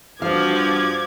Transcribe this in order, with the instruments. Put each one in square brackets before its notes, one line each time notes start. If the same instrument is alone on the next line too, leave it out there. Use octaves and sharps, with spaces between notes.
[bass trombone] G2 [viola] F3 F#4 [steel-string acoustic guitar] C5 F5 [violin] D6 G#6